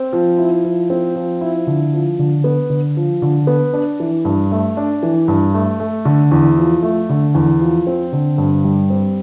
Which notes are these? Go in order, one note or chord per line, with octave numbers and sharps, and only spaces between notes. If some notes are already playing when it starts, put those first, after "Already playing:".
Already playing: C4
F3
E4
F3
C4
F3
E4
D3
F3
D3
B3
D3
F3
D3
B3
D4
E3
G2
A3
D4
E3
G2
A3
A3
D3
E2
F3
A3
D3
E2
F3
C4
D3
G2
G3
C4